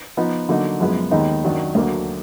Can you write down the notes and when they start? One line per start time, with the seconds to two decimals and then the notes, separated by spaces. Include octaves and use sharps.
0.17 F3 B3 D#4
0.49 D3 F#3 A#3 D#4
0.80 F#2 F3 G#3 B3
1.11 D#2 D#3 G#3 B3 D#4
1.43 F#2 D#3 F#3 D4
1.75 D2 D3 F#3 A#3